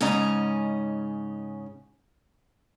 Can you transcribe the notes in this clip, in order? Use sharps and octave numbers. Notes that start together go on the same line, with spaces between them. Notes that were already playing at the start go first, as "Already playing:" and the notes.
G#2 C#3 C#4 D#5 A#5